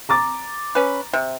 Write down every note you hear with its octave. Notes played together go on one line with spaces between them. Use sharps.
A#5 D6 A6
C#4 B4
C3